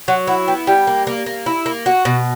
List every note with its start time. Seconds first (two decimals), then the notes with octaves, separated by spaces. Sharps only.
0.08 F#3 F#5
0.27 E4 F#5
0.47 B3 G5
0.67 G3 G5
0.87 A#3
1.07 A#3
1.26 A#3
1.46 E4
1.66 A#3
1.86 F#4 F#5
2.05 B2